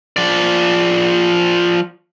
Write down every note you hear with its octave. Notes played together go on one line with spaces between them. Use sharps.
F3 D5